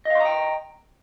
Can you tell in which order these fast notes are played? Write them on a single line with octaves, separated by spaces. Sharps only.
D#5 F5 C6 A#5 G5